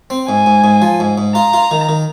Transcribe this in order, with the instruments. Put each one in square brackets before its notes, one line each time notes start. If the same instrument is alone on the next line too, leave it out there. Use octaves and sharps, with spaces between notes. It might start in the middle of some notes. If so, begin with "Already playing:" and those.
[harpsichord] C4
[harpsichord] G#2 [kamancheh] G#5
[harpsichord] G#2
G#2
F3
G#2
G#2
[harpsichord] F4 [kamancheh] A#5
[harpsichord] F4
D#3
D#3